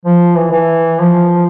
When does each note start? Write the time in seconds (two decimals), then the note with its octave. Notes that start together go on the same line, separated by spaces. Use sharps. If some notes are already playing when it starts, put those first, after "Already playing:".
0.05 F3
0.36 E3
0.51 E3
1.00 F3